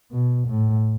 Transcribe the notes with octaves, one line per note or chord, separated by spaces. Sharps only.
B2
A2